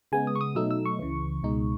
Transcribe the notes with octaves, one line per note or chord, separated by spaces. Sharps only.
C#3 G#3 B3 G#5
D#6
C#6
D#6
B2 F#3 A3 D#4 E6
E6
C#6
C#2 C#3 E3
C#2 B2 G#3 D#4